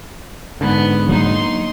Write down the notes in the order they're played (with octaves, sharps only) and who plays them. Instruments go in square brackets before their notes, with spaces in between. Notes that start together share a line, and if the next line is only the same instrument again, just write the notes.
[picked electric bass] G#2 D3 [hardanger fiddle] B3
[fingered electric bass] F#3 A#3 [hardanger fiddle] D#4 C6